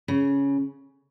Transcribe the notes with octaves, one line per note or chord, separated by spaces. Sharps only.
C#3